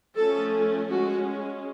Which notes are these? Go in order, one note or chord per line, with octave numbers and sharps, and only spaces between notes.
F3 A3 C#4 A4
G#3 C#4 F#4